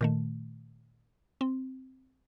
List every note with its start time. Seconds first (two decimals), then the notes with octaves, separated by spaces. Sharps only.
0.01 A#2 D#3 A3
1.41 C4